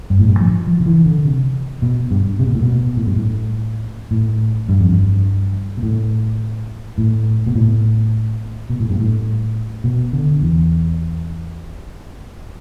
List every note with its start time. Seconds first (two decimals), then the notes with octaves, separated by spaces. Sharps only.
0.10 G2
0.19 A2
0.28 G2
0.39 F3
0.67 F3
0.80 D3
0.86 E3
1.06 D3
1.25 C3
1.82 B2
2.11 G2
2.39 C3
2.47 B2
2.54 A2
2.62 B2
2.97 A2
3.07 G2
3.16 A2
4.11 A2
4.69 G2
4.81 F2
4.93 G2
5.77 B2
5.83 A2
6.98 A2
7.47 B2
7.55 A2
8.70 B2
8.80 A2
8.90 G2
9.00 A2
9.84 B2
10.13 D3
10.41 E2